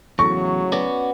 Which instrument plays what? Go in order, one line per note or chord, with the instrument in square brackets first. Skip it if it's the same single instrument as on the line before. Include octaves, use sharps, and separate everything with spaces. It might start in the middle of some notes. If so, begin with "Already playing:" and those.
[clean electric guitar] E2 [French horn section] A2 C#3 F#3 [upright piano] C#6
[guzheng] B3 [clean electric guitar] C#4 F#4 D5